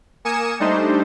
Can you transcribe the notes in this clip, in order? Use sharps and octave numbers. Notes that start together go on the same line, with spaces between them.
A#3 G#5 D#6 C#7 E7
G3 A3 D4 D#4 C5